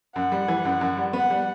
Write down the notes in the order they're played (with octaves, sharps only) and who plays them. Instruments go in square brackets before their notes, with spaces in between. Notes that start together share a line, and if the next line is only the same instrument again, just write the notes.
[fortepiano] F#2 [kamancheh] F#5
[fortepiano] G3
E3
F#2
F#2
G3
[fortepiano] B3 [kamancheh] F#5
[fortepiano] G3